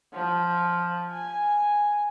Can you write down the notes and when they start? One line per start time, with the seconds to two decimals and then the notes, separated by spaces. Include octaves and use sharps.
0.13 F3
1.13 G#5